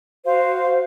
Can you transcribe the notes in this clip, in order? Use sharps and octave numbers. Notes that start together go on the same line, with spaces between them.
F#4 C5 F5